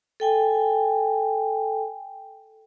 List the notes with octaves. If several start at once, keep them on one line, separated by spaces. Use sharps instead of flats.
A4 G5 G#5